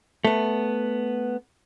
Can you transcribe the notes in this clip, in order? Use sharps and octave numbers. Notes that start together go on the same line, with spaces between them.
A3 B3